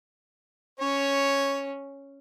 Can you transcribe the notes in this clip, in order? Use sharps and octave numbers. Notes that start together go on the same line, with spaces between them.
C#4 C#5